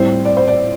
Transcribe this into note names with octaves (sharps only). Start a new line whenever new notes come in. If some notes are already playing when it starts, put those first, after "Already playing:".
Already playing: A2 G3 C4 C5
D5
C5
D5